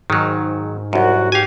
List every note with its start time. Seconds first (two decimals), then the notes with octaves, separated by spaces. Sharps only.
0.10 G#2 D#3 F#3
0.93 C2 F#2 F#4
1.32 G4 F5 G#5